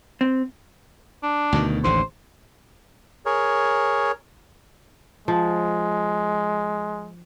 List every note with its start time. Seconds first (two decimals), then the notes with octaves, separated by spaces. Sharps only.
0.21 C4
1.23 D4
1.53 D2 B2 D#3
1.84 A1 D#2 D3 C5
3.26 G#4 A#4 C#5
5.28 F3 G#3